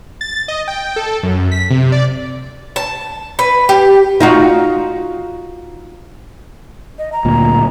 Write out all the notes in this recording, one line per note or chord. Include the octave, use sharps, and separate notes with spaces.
A6
D#5
G5
A4
F#2
B6
C3
D5
A5
B4
G4
D#4 F4 F#4
D#5
A#5
D2 A#2